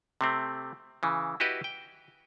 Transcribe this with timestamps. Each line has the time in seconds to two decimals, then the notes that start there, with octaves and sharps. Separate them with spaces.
0.21 C3 A3 C4
1.03 C#3 E3
1.40 E4 F#4 G4 B4 D#5
1.64 G5